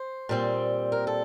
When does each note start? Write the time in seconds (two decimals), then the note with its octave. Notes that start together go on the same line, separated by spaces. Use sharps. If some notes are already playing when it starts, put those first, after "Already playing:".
Already playing: C5
0.29 A#2 G3 C4
0.92 A#4
1.07 A4